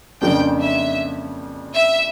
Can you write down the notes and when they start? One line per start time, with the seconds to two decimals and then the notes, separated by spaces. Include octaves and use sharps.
0.21 F2 C#3 F3 A#3 D4 G5
0.60 E5
1.75 E5